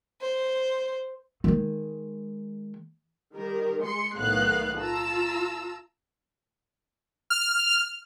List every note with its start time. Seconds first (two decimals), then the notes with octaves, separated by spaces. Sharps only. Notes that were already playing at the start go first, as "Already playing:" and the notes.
0.21 C5
1.44 D#3 G#3
3.35 D#3 G3 A#4
3.82 G#3 C6 C#7
4.18 B1 A2 D#3 B3 F5 F#6
4.78 F4 A5 A#5 E6
7.30 F6